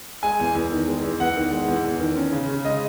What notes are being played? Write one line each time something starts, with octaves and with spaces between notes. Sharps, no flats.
G#3 G#5
E2
E2
D#3
G#3
E2
E2 F#5
D#3
G#3
E2
E2
D#3
C#4
C#3
C#3
G#3 D#5